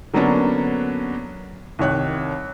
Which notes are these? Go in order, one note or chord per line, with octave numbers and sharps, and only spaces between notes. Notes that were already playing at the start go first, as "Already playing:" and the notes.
D3 F#3 A#3 B3 C#4 D4
C2 D#3 C#5 F#6